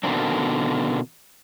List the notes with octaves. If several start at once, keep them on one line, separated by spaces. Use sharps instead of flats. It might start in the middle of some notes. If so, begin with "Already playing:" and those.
B2 D3 D#3 A#3 C4 D4